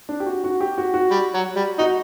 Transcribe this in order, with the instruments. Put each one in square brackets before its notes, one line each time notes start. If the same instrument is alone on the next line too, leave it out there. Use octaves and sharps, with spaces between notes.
[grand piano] D4
G4
F#4
F#4
G4
F#4
F#4
[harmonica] G3
F#3
G3
[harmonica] D#4 [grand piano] F#4